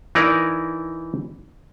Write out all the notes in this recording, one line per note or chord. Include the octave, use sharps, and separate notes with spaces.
E3 D#4 E4 A#4 D5